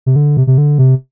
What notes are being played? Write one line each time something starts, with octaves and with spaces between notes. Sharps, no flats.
C3
D3
C3
C3
D3
C3